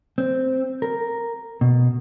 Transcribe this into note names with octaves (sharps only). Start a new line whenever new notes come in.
C4
A#4
B2